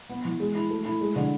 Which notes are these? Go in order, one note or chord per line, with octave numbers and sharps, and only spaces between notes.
B3
E3
G#3
E4
A3
E4
G#3
D3